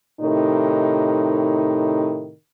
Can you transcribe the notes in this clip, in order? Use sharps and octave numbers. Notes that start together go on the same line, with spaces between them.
A2 C3 D#3 D#4